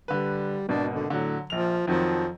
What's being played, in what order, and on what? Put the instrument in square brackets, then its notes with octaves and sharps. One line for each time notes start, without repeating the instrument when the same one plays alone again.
[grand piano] D3 B4 [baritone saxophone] G3
[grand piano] G#1 B2 [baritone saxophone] D4
[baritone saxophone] D3
[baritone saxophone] A2 [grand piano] D3 F#3
[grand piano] A#1 F7 [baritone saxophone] F3
[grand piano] F2 D#3 F#3 [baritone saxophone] F3